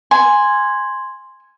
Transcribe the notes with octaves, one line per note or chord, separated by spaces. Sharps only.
G#5 C6